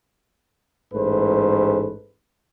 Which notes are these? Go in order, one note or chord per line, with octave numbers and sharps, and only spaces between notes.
A1 G#2 A3 B4 C5